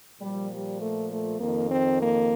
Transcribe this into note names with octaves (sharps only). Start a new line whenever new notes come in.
A#2 F3 G3
G3
A3
A3
F2 D#3 A#3
C4
A#3